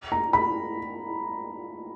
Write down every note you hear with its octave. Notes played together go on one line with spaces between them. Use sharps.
A#5
B5